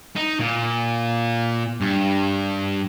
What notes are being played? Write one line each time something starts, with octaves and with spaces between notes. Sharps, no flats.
D#4
A#2
G2